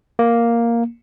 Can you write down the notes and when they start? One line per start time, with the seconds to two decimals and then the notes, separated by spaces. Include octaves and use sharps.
0.19 A#3